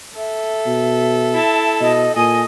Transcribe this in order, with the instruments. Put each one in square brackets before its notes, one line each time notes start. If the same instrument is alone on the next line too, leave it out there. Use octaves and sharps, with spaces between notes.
[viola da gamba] A4 [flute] E5
[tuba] B2
[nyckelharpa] E4 A5
[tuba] B2 [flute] D#5
[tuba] A#2 [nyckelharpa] D#5 [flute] G#5